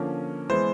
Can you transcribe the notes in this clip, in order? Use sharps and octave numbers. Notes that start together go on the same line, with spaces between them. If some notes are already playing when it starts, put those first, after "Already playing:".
Already playing: D3 F3 A#3 C#4
E3 G#3 B3 C5